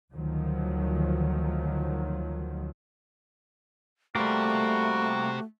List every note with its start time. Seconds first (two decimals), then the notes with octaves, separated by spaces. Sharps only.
0.12 D2 D#3 F3 F#3
4.15 G3 A3 A#3 F#4 G4 C5